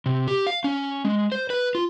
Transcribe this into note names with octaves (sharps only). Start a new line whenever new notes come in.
C3
G4
F5
C#4
G#3
C5
B4
F4